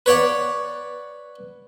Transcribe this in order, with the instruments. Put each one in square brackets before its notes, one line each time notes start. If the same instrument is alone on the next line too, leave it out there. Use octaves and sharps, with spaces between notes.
[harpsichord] B4 C#5 D5 F#5